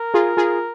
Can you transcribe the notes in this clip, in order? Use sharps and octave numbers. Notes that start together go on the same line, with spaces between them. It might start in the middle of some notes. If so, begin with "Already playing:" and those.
Already playing: A#4
F4 G#4
F4 G#4